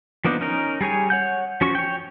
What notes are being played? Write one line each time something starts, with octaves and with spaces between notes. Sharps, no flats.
F3 A#3 B3 D4 D#4
C#4 D#4 A#4
G3 G#4 C#5 G#5
C#5 F#5 G6
F3 C#4 F#4 C#6
C#5 G5